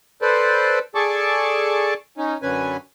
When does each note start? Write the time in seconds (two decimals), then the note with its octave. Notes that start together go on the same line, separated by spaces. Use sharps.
0.22 A4 B4 C5 D5
0.95 G#4 A4 D5 A5 C#6 D6
2.17 C#4 D#4
2.42 F#2 D3 C#4 B4 G#5